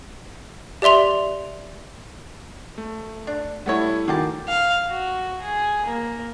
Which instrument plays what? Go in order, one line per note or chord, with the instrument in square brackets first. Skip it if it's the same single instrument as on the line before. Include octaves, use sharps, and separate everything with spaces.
[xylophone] G4 D5 E5 C6 F7
[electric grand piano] A3
[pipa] D4
[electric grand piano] G3 A3 E4 [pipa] B3 C#5
[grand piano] D#3 F#4 D6 [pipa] G#4 G5 A5
[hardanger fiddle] F5
F#4
G#4
A#3